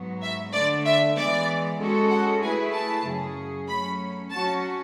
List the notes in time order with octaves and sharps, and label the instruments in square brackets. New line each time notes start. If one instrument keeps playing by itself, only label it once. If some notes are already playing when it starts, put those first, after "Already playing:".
Already playing: [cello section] G#2 F#3 B3 F#4
[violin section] E5
[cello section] D3 A3 D4 [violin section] D5
[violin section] E5
[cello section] E3 G#3 B3 [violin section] D5
[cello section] G#3 C#4 F#4 A4
[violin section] F#5
[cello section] A3 E4 G#4 B4 [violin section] G#5
[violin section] A5
[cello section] F#2 C#3 F#3 C#4 G#4
[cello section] F#3 A3 C#4 [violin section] B5
[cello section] F#3 C#4 F#4 [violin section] A5